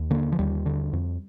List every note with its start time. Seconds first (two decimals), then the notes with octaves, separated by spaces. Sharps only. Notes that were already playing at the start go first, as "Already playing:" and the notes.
Already playing: D#2
0.11 D3 A#3
0.32 F3
0.39 D#2 G3
0.66 D3
0.93 F2